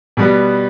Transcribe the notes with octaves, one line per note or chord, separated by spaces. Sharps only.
B2 G3 B3